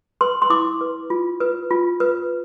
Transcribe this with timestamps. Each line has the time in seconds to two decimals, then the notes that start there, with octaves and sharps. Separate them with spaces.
0.21 B4 C6
0.42 C6
0.50 E4 D6
0.81 B4
1.10 F4
1.40 B4
1.71 F4
2.00 B4